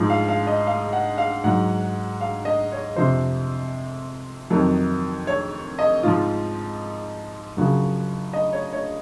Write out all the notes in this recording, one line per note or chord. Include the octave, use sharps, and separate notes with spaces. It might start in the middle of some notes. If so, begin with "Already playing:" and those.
Already playing: G#2 F3
F5
F5
D#5
F5
F#5
F5
G#2 F#3 F#5
F5
D#5
C#5
F2 C3 F3 C5
F2 D#3 F#3
C#5
D#5
G#2 F3 F4
F#2 C#3 F3 F#4
D#5
C#5
C#5